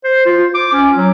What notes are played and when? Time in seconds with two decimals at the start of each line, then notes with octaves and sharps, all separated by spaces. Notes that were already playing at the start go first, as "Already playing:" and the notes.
0.04 C5
0.25 F4
0.54 D6
0.72 C#4
0.96 F#3